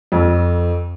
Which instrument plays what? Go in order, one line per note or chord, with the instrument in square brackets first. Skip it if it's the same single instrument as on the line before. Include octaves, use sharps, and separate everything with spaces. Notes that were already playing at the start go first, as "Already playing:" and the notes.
[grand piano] F2